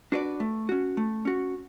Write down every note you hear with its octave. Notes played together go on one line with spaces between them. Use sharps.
D4 F#4 B4 D5
A3
C#4 F#4
A3
C#4 F#4